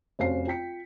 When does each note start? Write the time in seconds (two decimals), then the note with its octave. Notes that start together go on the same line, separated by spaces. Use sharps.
0.19 F1 C#4 F#4 C5 F5 C7
0.47 F4 G5 B6 C#7